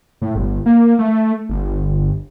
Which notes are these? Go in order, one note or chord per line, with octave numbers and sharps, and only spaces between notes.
A2
G1
A#3
A3
G1